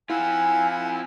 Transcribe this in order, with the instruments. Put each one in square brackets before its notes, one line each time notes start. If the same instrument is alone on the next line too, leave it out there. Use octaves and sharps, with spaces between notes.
[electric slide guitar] C4 F4 [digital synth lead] E4 [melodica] F5 F#5 [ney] G#5